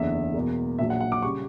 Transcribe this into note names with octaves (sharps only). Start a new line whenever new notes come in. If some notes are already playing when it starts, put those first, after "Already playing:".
Already playing: F#1 E2 D3 E5
E1 E2 B2 A#3
A#1 A#2 F#3 E5
F#5
F#5
D6
C#3 G3 C#6